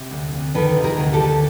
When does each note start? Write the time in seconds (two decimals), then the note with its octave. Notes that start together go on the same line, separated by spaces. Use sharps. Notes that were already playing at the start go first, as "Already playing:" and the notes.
Already playing: C3
0.11 D2
0.33 D2
0.55 D#3 A4 B4
0.77 C3
0.84 G#4 A#4
0.99 D2
1.13 G4 A4
1.20 D2